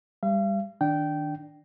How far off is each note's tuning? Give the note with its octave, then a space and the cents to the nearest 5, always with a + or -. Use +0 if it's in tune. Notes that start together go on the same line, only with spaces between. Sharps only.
G3 +25 F5 -40
D#3 +0 D4 +0 G5 -15